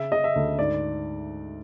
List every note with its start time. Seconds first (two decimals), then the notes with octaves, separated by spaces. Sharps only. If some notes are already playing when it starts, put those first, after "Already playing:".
Already playing: C#3 E5
0.12 C#3 D#5
0.24 E5
0.36 D2
0.59 G#2 D5